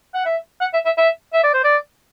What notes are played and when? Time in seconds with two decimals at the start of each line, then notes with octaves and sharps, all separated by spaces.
0.14 F#5
0.25 E5
0.61 F#5
0.73 E5
0.85 E5
0.98 E5
1.33 E5
1.44 D5
1.54 C5
1.64 D5